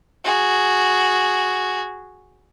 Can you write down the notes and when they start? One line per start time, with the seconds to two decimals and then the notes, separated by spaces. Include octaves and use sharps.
0.24 F#4 G#4